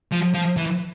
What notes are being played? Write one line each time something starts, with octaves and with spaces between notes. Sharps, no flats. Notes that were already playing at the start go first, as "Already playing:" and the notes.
F3
F3
E3